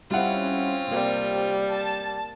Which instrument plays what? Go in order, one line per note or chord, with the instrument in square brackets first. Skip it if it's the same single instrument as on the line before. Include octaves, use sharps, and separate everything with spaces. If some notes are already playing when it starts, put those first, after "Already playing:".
[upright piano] G3 E4 F#5 [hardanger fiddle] C4 F4 [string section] C#4
[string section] C3 [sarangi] G3 [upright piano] A#3
[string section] A5